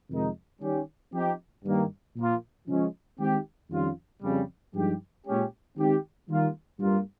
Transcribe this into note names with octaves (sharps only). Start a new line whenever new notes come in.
F2 C3 D#3 G#3 D#4
D#3 G3 C#4 G4
F3 C4 D#4 G4
G2 D#3 A#3
A#2 F3 A#3 F4
C#3 F3 G#3 C#4
D#3 G#3 C4 D#4 G4
F2 D#3 G3 C#4 F4
F2 C#3 G3
G2 F3 G#3 D#4 G4
A#2 G#3 C#4 G4
D#3 G#3 C4 D#4 G4
D#3 G3 A#3 F4
G2 G3 A#3 F4